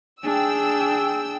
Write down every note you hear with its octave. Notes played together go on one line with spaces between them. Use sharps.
D4 G#4 G5 E6